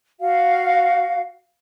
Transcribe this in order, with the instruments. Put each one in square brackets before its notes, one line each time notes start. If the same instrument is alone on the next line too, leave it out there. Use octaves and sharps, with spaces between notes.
[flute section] F#4 F5